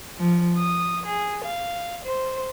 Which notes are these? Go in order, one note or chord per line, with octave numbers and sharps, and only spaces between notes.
F3
D#6
G#4
F5
C5